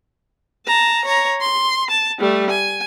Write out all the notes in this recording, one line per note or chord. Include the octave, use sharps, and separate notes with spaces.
A5 A#5
C#5 A#5
C6
A5
G3 A3
G#5